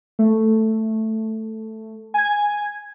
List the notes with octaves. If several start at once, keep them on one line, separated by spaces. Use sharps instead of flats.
A3
G#5 G#6